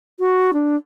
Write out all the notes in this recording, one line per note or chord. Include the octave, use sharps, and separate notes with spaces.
F#4
D4